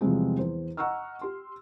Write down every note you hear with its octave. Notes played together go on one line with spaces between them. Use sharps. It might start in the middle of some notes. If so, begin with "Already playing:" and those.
E2 C3 F3 G3 G#3 C4
E2 C5
D#5 F#5 A#5 C#6 E6 F6
G4 C6